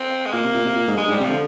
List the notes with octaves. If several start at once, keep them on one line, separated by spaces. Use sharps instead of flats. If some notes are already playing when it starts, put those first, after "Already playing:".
Already playing: C4
G#3
A#2 A#3
C3
A#2
C3
A#2
G#2
G2 G#3
G#2
G3
C3
D3 F3